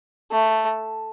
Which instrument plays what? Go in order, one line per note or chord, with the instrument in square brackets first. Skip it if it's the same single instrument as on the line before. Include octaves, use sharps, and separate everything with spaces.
[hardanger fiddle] A3